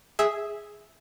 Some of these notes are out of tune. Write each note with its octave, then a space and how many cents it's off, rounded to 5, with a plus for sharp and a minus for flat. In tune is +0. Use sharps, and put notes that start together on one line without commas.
G#4 +0 E5 -10